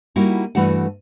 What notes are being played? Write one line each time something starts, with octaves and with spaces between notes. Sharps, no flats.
G3 A#3 D#4 E4 F#4
G2 E3 A3 F#4 F#5